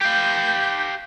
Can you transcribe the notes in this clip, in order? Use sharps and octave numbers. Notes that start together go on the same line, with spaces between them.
G4 F5 G6